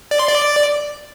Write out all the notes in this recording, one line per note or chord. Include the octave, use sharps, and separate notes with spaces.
D5
C6
D5